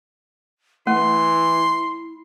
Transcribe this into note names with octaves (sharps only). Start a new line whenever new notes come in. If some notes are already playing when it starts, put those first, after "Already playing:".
E3 A3 E4 C6